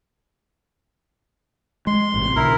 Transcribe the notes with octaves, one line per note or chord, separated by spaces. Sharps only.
G#3 C6
A1 A2 C3
B1 D3 E4 A#4